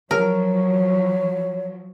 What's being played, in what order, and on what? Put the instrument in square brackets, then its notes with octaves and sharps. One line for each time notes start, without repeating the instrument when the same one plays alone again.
[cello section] F3 F#3 [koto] A#4 [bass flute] C#5